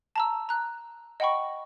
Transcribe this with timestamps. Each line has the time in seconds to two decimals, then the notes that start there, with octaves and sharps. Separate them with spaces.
0.16 A5 A#5 E6
0.49 A#5 F#6
1.20 D#5 F#5 G5 B5 C#6